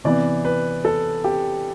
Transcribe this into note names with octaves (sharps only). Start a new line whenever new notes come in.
C3 E3 B3 D5
B4
A4
G4